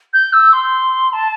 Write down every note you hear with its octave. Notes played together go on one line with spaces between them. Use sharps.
G6
E6
C6
A5